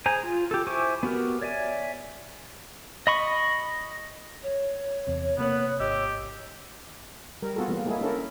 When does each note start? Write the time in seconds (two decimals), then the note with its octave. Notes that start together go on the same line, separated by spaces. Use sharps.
0.06 G#4 C5 G#5 A#5
0.23 F4
0.51 G4 A4
0.67 E4 C5 G#5 C#6 D6
1.03 B3 F#4 G4 A#4
1.42 C#5 D5 E5 G#5
3.07 D#5 B5 C#6
4.43 C#5
5.07 E2 C3
5.38 C3 A#3 B3 F#6
5.80 G#1 G4 D#5 E6
7.42 G3 A#4
7.56 B3 F4 F#4 G#4 A4
7.68 E3 G3 A#3 B3
7.86 G#3 A#3 E4 G#4 A4
8.01 C#4 D4 E4 A4 A#4